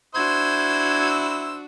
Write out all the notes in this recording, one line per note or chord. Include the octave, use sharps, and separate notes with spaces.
D4 E4 F#4 C5 E6 G#6